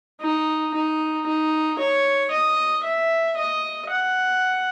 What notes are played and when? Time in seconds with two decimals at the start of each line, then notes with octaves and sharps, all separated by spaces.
0.21 D#4
0.74 D#4
1.27 D#4
1.79 C#5
2.31 D#5
2.84 E5
3.37 D#5
3.90 F#5